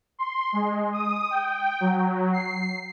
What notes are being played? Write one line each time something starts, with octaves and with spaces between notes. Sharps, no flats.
C6
G#3
D#6
G5
F#3
C7